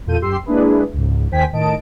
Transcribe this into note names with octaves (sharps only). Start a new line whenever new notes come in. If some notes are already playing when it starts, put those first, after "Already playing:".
E2 A#2 F4 A4 G6 D#7
F#2 G4 C6 E6 C7
G#3 A#3 D4 E4 G#4 B4
C#2 G#2
D#2 D#3 C5 G5 G#5 B6
A2 D#3 D#5 A5 D7